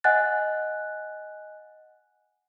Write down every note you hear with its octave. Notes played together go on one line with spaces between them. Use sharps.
D#5 F#5 G#5 F#6 A6